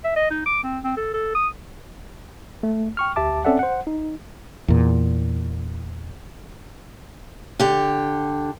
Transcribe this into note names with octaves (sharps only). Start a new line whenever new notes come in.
E5
D#5
D#4
D6
C4
C4
A4
A4
D#6
A3
G5 C#6 F6
D2 G4 E5 A5 D6
C4 C#4 A4 D5 E5 F#5
C5 F#5
D#4
E2 A#2
D3 G4